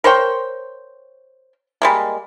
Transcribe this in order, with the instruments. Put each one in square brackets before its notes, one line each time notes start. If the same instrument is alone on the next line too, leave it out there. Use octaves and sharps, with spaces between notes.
[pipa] A#4 C5 C#5 G5
G3 G#3 A#3